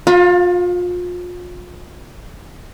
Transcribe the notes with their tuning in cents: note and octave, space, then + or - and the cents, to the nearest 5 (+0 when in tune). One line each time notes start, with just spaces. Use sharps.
F4 +35 F5 +0 B5 -10